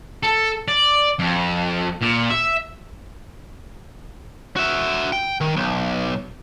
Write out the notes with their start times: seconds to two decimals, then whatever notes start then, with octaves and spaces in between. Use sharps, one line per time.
0.23 A4
0.68 D5
1.19 F2
2.02 A#2
2.30 E5
4.56 F#4 E5
5.12 G5
5.41 D#3
5.56 B1